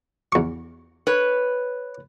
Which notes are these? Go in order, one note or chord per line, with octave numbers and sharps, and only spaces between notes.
E2 C#6
B4 C#5